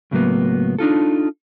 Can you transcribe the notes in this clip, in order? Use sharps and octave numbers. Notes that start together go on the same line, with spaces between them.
C#2 A2 F#3 A#3 B3
D4 D#4 F4 A4